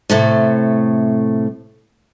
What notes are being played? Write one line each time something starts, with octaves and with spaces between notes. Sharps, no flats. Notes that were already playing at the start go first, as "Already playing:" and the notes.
A2 C3 A3